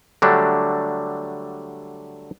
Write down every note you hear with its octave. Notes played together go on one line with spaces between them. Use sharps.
D3 F#3 G3 A3 D4